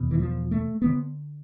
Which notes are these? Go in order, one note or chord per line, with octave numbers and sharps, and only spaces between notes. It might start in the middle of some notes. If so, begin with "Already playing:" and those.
Already playing: E2 B2
E3
F3
A3
D3 B3